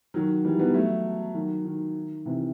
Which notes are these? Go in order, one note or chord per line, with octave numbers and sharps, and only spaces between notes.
D#3 F#3
E3 G3
G3 B3
F#3 A3
D#3 F#3
D#3
C3 E3